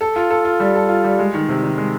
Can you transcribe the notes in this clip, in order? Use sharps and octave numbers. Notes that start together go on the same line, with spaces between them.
A4
F4
A4
F4
G3
A4
F4
G3
G#3
D#3
C3
D#3
G#3